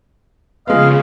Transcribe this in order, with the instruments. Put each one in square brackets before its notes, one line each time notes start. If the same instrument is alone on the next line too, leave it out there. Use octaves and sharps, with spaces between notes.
[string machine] C#3 [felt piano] F3 G#3 B3 [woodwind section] D#5 F5